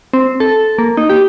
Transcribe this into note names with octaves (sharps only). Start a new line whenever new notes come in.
C4
A4
A#3
D#4
G4